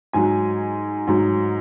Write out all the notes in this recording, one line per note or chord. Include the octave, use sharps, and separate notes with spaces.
G#2 F#3 G#5
G#2 F#3